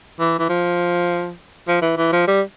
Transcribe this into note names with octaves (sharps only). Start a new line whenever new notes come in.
E3
E3
F3
F3
E3
E3
F3
G3